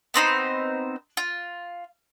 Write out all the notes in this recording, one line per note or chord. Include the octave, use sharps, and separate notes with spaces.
B3 C4 D#4 C5
F4